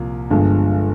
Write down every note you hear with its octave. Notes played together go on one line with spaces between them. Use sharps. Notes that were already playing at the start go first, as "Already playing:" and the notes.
Already playing: C2 A#2 F3 A#3
G1 G2 F3 G#3